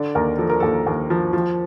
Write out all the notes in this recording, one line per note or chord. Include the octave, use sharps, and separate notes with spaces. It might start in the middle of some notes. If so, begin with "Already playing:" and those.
Already playing: D3 D5
D#2 A#4
F3 A4
A#4
D#2 A4
D#2
F3
F3